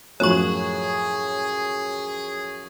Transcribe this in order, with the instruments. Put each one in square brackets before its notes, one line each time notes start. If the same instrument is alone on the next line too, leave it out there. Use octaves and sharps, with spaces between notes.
[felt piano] F#2 A2 F3 [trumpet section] G#4 [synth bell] C#5 C#6